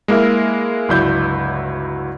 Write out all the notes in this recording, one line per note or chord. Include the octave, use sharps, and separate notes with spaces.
G#3 A#3 E4 A#4 E5
G1 C#2 F#3 E4 D5 G6